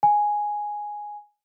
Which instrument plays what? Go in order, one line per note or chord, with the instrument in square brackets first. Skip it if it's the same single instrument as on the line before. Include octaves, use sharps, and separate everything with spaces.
[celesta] G#5